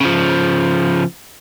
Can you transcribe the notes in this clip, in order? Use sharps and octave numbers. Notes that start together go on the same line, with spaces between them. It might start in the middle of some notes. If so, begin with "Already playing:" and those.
C#3 F3